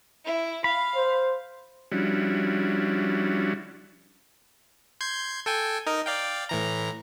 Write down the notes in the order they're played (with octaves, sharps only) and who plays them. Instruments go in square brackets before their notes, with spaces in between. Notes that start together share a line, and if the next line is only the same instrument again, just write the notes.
[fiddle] E4
[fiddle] F5 [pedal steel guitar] B5
[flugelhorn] C5
[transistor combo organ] F3 G3 C#4 D4 E4 F#4
[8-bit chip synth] C6 G6 G#6
A4 G5 G#5
D#4 A#4 D#5
D5 F5 G5
A2 E3 A#5